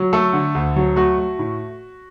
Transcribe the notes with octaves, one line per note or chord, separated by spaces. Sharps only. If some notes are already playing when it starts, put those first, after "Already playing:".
Already playing: F#3
A3 A4
D3
D2
F#3
A3 F#4
A3
A2